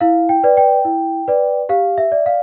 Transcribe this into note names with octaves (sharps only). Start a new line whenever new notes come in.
E4 F5
G5
B4 D5
G5
E4
B4 D5
G4 F5
E5
D5
F5